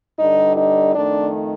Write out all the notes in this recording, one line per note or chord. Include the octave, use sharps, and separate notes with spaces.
G2 D3 G3 D#4
D#4
F2 D#3 A3 D4